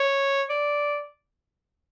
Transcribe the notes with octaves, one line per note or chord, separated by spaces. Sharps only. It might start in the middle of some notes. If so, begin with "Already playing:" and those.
Already playing: C#5
D5